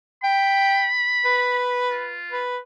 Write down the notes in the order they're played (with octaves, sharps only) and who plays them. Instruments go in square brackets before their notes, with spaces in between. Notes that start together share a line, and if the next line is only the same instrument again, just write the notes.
[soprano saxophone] G5 [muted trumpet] B5
[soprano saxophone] B4
[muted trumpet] F4
[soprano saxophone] B4